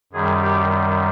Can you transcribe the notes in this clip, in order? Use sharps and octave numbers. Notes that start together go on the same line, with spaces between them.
F#2 D#3 G3 G#4
G4